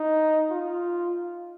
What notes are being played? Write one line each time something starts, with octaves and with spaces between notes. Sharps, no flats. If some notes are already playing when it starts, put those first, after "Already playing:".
Already playing: D#4
F4